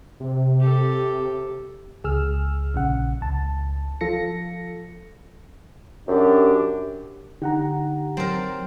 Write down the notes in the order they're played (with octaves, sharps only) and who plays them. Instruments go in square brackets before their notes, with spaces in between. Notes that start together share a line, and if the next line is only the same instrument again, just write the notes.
[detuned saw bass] C3
[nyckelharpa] G4 A4
[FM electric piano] C#2 G#4 E6 F6
A#1 C#3 F#5
C#2 A5
F3 F4 A4 A#6 C#7
[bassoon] F#2 [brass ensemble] D4 G4
[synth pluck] D3 D#4 [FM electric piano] G4 F#5 A#5
[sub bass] F#3 [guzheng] C4 A#4 [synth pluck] A6